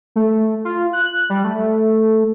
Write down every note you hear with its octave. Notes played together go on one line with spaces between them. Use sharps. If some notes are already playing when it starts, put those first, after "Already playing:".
A3
F4
F#6
G3
A3